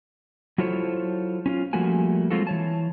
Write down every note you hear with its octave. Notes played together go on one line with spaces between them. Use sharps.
F#3 E4 F4 A4 C5 C#5
C#4 D#4 F4
F3 G3 A3 A#3 F#4 G#5
F#3 G#3 C4 F4 F#4 A4
E3 C#5 A5